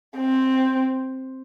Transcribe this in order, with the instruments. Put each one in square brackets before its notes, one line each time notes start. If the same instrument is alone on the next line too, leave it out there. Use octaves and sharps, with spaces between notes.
[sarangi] C4